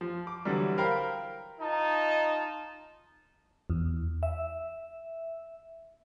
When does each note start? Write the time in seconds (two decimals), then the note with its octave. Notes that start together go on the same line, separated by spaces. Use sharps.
0.01 F3
0.27 D6
0.45 D3 E3 F#3 G3
0.78 A#4 C5 F5 G5 B5
1.60 D#4 F4 D#5 A5
3.70 E2
4.23 E5